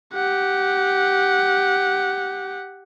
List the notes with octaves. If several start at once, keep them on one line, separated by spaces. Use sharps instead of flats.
G4 F#5